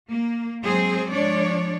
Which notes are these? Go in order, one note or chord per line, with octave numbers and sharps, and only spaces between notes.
A#3
F#3 G#3 C4 G#4 C5
F3 G#3 D4 C#5 D5